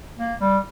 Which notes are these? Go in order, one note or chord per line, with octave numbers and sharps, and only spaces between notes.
A#3
G3